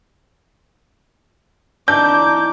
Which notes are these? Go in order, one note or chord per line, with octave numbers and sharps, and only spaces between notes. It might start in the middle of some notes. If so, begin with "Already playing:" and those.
D#3 E3 D4 A#4 D6 G6